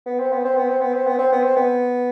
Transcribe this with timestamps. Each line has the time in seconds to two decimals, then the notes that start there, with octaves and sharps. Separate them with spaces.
0.06 B3
0.19 C4
0.32 B3
0.44 C4
0.57 B3
0.69 C4
0.81 B3
0.94 C4
1.07 B3
1.18 C4
1.32 B3
1.43 C4
1.56 B3